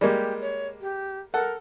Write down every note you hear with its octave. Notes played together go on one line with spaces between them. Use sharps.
G3 G#3 A#3 G4
C#5
G4
A4 A#4 F#5